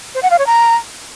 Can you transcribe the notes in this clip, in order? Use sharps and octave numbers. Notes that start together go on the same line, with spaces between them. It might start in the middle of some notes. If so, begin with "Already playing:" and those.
C5
F#5
F5
C#5
A#5